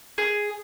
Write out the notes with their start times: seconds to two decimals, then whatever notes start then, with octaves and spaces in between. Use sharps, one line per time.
0.18 G#4